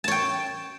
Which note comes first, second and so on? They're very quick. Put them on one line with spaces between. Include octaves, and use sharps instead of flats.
A5 C#5 G5